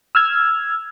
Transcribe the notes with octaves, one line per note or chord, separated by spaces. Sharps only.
E6 F6 G#6